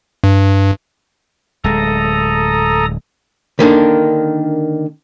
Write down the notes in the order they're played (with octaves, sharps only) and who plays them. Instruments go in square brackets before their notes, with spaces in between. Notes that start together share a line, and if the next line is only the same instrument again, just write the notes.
[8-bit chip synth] G2
[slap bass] D1 G#3 [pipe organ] A4 A#5 D#6
[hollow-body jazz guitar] D3 D#3 A#3 D4